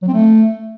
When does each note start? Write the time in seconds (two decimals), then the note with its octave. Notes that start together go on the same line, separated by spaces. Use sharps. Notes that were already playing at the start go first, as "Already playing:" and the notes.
0.02 F#3
0.08 C4
0.13 A3